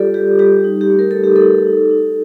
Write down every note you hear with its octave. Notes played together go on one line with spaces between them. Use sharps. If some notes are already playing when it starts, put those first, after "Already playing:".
Already playing: G3 F4 G4 A4 D5
G3 G4
G3 G4
D#4
G4
A3
A#4
A3 A4
G4
D#4 A4
D#4
D#4